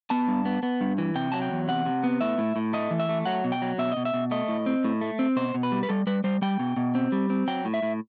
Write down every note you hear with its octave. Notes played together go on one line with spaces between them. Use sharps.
B3 A5
G2
B3
B3
G2
E3
C3 G5
F#3 A5
G5
E2
C3 F#5
C3
B3
A2 E5
A2
A2
A3 D#5
E3
E5
A3
F#3 F#5
B2
G5
F#3
B2 E5
D#5
B2
E5
B2
A3 D#5
A2
C4
A2
A3
C4
B2 C5
B2
B4
G3
B4
G3 A4
G3 B4
G3 C5
G3 G5
B2
B2
C4
G3
C4
F#3 G5
A2
E5
A2